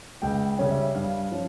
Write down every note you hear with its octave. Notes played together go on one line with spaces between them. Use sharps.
C#2 G5
C#3 G3 C#4
E5
G2 F5
F3 C#4